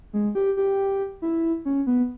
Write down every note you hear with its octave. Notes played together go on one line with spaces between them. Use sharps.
G#3
G4
G4
E4
C#4
B3